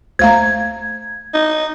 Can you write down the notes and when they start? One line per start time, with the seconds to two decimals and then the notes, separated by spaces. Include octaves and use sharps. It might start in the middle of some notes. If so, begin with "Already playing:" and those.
0.19 D2 A3 C5 F5 A#5 G#6
1.34 D#4